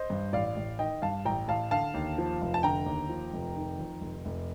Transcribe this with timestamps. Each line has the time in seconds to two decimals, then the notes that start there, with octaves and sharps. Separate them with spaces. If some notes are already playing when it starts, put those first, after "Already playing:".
Already playing: C5 D#5
0.10 G2
0.33 A1 D5 F5
0.57 A1
0.79 D#3 D#5 G5
1.02 G2 F5 A5
1.25 A1 G5 A#5
1.48 A1 F5 A5
1.71 D3 F5 A5
1.94 D#2
2.18 F3
2.41 F1
2.54 A5
2.63 D3 G5 A#5
2.86 D#2
3.09 F3
3.33 F1
3.56 D#3
3.79 F2
4.01 F1
4.25 F1